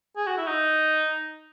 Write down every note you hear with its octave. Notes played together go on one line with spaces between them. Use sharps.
G#4
F#4
E4
D#4